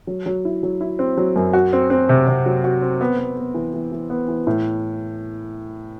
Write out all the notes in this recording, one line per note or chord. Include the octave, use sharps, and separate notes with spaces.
F#3
F#3
E4
F#3
E4
C4
F#3
F#2
F#4
C4
C4
C3
C3
F#3
F#4
C4
B3
B3
B3
E3
E3
E3
B3
E3
A2